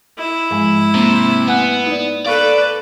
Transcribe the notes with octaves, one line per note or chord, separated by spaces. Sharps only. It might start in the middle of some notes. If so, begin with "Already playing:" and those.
E4
G#2 F3 G#3
C3 A#3
B3 F#5 G#5 F#6
D#4 D5
A4 B4 D5 F5 C#6 F#6